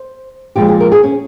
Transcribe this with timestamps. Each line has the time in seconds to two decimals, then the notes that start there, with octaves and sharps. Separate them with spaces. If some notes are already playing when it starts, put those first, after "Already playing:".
Already playing: C5
0.56 A#2 F3 G#3 G4
0.68 G#4
0.80 A#4
0.92 G#4
1.04 C#4